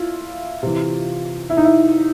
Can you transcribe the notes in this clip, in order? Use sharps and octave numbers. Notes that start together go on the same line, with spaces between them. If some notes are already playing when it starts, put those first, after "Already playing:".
Already playing: E4 F4
C3 E3
E4
D#4
E4